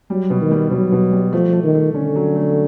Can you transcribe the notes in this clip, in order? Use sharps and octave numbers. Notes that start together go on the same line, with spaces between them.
F#3 G3
B2
D#3
G3
B2 F#3
B2
G3
F3 A3
A3
D#3
A3
D3 C#4
F#3
A3